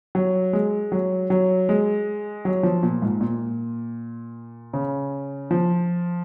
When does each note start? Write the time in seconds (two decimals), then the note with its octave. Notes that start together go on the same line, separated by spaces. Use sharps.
0.15 F#3
0.53 G#3
0.92 F#3
1.30 F#3
1.69 G#3
2.45 F#3
2.63 F3
2.83 A#2
3.02 G#2
3.21 A#2
4.73 C#3
5.51 F3